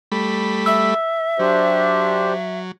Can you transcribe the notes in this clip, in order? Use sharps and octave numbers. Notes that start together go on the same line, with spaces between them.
G3 A3 B5
E5 E6
F#3 D4 G4 C5